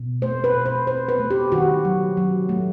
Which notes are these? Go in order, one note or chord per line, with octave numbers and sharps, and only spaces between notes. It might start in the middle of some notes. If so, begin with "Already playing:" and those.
Already playing: B2
A3 C5
B4
B2
C5
A3 C5
B4
A3
G4
D#3 F#4
F#3
F#3
A3